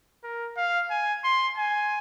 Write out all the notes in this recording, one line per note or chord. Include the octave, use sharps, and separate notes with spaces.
A#4
F5
G#5
C6
G#5